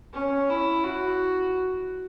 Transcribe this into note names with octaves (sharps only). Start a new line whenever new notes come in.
C#4
E4
F#4